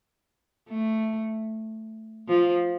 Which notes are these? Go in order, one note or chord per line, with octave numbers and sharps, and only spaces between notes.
A3
F3